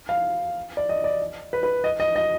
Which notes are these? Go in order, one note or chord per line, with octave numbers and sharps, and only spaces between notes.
F5
D5
D#5
D5
B4
B4
D#5
D#5
D#5